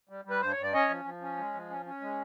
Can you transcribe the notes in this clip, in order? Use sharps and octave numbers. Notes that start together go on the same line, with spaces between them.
G3
G3
B4
G2 C5
C#5
G2
D5
C#4 C#5 D#5
F3
F3
C#4
G#3
F3
C#4
C#4
G#3